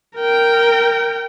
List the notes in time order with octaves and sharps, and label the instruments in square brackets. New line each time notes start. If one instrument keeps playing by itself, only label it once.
[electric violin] A#4 G5